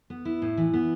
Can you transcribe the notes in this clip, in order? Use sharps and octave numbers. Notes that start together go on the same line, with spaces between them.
B3
E4
A2
E3
B3